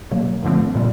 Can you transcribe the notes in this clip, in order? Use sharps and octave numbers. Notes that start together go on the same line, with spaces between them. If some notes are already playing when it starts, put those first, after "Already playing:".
B2 F#3 A#3
G2 D3 F3 A3 C4
A#2 G3